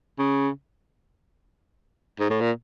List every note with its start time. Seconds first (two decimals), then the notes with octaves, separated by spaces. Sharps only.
0.19 C#3
2.20 G#2
2.30 A2
2.41 A#2